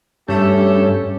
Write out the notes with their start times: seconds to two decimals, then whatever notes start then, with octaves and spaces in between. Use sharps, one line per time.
0.28 G2 A3 C#4 G4 A4